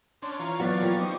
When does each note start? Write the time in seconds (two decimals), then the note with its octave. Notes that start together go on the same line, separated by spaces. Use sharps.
0.22 C#4 D4 C6
0.39 E3 F4 C#5 A#5
0.60 F#3 B3 F#4 D5
0.81 F3 G3 A#3
0.99 C4 D#4 C#6 D6